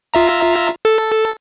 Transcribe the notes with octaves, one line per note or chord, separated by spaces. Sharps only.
F4 E5 A#5
A4